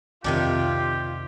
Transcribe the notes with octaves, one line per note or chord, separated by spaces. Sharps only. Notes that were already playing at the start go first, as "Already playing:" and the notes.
C2 F2 C3 D#3 D4 F4 G4